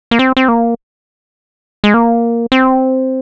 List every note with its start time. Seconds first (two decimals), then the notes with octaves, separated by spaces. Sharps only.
0.11 A#3
0.19 C4
0.37 C4
0.48 A#3
1.84 G#3
1.94 A#3
2.52 C4